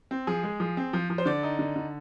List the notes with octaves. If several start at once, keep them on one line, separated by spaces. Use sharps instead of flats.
C4
F3 G#4
G#3
F3
C4
F3
F3
C5
D3 D5
D#4
D3
D3